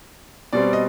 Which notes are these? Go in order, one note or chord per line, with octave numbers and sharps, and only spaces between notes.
B2 G3 C4 D5
D#5